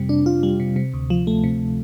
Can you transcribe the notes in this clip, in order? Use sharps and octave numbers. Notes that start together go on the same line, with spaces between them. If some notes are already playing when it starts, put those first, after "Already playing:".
Already playing: F2 C3 G3
D4
F4
G3
C3
C3
D2
F3
A3
C3